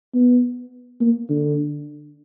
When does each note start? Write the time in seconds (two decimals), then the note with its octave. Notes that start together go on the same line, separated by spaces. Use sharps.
0.15 B3
1.01 A#3
1.30 D3